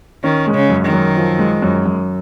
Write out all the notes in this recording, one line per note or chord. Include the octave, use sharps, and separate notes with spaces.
D#3 C#4
G#3
C#3
F#2
D#3
F#2
F3
G#3
F#2
F#2